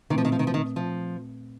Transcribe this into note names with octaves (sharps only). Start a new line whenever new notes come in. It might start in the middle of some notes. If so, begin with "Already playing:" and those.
A#2 D#3 A3 C4
F3
D#3
F3
D#3
F3
D#3
F3